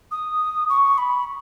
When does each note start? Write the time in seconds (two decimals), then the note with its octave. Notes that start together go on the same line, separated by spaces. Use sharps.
0.11 D#6
0.69 C#6
0.98 B5